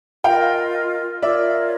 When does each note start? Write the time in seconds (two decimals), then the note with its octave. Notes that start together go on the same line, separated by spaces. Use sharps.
0.24 F4 A#4 D#5 F5 G5
1.22 F4 A#4 C#5 D5 E5